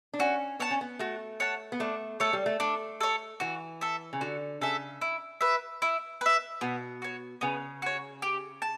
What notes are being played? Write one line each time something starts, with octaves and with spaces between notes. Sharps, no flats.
D4
C#4 F#4
B3 C#5 F#5 A5
C#4
B3
A3 F#4
C#5 F#5 A5
B3
A3 D4
A3 A4 C#5
G3
A3
A3 D4
A4 C#5
E3 F#4
A4 E5
C#3
D3 F#4
C#3 A4 E5
E4
B4 E5
E4
B4 E5
B2 B3
F#4 C#5
C#3 B3
F#4 C#5
G4
A5